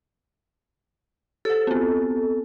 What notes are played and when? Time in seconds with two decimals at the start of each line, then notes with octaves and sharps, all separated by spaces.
1.45 G4 A4 C5
1.67 B3 C4